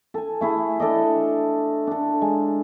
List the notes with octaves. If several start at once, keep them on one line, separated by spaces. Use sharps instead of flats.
A4 G#5
A3 E4 G#4
D4 A4 D5 D#5
D4 A4
G#3